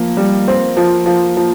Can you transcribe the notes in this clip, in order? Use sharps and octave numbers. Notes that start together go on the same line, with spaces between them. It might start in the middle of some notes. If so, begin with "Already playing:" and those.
Already playing: F3 A#3
G3
C4
F3
F3
F3